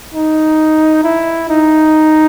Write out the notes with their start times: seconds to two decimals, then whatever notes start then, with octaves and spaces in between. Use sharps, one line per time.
0.14 D#4
1.04 E4
1.49 D#4